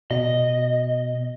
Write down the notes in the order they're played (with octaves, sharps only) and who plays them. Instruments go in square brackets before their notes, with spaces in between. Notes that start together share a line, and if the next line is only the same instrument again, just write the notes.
[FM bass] B2 [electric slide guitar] D#5